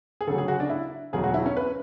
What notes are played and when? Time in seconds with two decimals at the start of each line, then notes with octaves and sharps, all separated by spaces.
0.21 G#4
0.27 D2 C#3 F#3 A4
0.38 G#4
0.48 F#4
0.60 D4
0.70 E4
1.13 E1 D2 D3 F#3 G#4
1.24 F#4
1.34 E4
1.46 C#4
1.57 B4